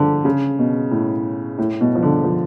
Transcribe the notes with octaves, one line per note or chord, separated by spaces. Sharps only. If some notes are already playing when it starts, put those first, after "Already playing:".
Already playing: D3 F3
C#3
B2
A2
A2
B2
F3
D3
F3